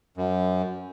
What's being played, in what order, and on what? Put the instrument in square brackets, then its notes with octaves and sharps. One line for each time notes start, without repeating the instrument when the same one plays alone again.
[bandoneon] F#2